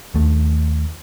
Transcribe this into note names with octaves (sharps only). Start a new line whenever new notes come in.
D#2 A3